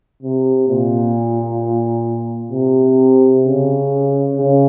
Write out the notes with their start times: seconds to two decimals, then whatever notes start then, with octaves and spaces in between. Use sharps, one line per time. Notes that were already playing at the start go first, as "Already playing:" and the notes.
0.23 C3
0.69 A#2
2.52 C3
3.44 C#3
4.37 C#3